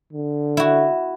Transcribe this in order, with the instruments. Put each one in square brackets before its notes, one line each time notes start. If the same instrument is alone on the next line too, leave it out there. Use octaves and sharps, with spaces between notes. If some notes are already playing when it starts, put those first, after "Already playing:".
[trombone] D3
[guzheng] E4 F#4